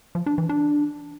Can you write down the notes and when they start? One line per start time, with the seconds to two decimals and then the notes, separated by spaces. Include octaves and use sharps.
0.15 F3
0.26 D4
0.38 E3
0.49 D4